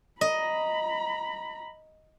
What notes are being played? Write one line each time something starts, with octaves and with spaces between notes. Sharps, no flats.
D#5 A#5 B5